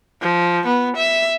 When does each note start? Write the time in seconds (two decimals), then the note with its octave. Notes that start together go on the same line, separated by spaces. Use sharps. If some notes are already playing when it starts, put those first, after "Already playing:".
0.22 F3
0.66 B3
0.96 E5